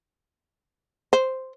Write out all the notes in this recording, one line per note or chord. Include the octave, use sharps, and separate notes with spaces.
C5